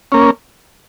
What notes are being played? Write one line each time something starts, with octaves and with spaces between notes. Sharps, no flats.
A#3 C#4